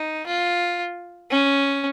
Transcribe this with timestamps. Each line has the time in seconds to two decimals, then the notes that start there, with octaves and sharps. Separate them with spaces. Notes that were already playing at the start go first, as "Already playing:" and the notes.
Already playing: D#4
0.27 F4
1.31 C#4